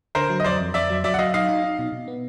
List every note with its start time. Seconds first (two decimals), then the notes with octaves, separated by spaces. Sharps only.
0.15 D3 A#4 C5
0.30 F#3
0.40 D#5
0.44 F2 C5 D5
0.60 F2
0.74 F2 D5 E5
0.90 F#3
1.04 F#3 D5 E5
1.14 F#5
1.19 F#3 D#5 F5
1.34 D#4 D#5 F5
1.49 D#4
1.64 D#4
1.79 B2
1.92 B2
2.08 B3